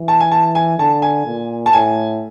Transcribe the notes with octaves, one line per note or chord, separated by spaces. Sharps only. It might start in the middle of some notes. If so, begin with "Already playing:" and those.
Already playing: E3
A5
G#5
A5
G#5
D3 A5
G#5
A#2
A5
A2 G#5